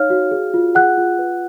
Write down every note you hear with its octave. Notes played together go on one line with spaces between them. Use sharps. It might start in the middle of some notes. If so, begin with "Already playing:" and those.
Already playing: D#4 C#5 F5 F6
F#4
G#4
F4
G#4 F#5 F#6
F4
B4